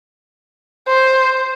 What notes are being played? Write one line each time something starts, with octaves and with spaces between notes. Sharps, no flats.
C5